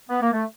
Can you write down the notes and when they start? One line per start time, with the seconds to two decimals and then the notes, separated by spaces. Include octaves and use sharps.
0.10 B3
0.22 A#3
0.33 A3